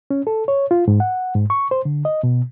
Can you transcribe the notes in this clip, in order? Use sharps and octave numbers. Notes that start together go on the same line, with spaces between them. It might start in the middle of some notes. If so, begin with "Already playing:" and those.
C#4
A4
C#5
F4
G#2
F#5
G#2
C#6
C5
D3
D#5
B2